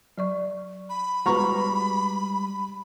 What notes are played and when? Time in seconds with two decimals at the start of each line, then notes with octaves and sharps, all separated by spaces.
0.18 F#3 D5 C#6
0.89 B5
1.26 G3 G#3 F#4 B4 A#5 C#6